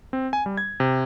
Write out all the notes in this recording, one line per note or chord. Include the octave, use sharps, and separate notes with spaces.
C4
G#5
G3
G#6
C3